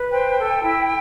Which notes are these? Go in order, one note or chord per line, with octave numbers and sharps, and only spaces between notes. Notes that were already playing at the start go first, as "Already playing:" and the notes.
Already playing: B4
C5 G5
A4
E4